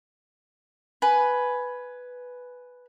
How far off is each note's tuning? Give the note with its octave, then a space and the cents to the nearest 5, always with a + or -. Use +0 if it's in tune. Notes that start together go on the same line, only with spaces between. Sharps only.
B4 +0 G#5 +15